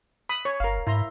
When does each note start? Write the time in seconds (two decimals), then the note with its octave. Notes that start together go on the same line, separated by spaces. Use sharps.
0.29 B5 D#6
0.45 C#5
0.60 G1 A#4 F5
0.87 G#2 E4 A#5 C6